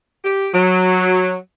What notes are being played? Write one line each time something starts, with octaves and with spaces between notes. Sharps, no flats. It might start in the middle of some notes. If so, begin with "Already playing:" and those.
G4
F#3